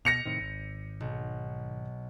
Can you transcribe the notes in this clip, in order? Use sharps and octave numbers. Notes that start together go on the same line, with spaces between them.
B2 A#6 C#7 F7
A2 C3 D#3
G#1
B1